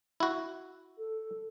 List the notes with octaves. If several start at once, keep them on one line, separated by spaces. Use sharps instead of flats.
E4 F#4
A4